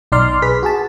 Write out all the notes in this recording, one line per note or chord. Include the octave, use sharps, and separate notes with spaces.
B1 D#4 D5 C6 F6
G#4 B4 B6
F#4 G#4 A5